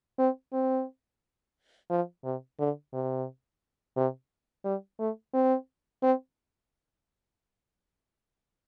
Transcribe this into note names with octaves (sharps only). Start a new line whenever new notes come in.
C4
C4
F3
C3
D3
C3
C3
G3
A3
C4
C4